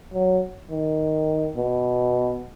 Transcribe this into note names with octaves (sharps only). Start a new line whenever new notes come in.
F#3
D#3
B2